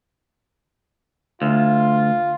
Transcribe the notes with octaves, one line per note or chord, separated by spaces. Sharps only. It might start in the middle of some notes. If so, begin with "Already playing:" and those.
D2 F4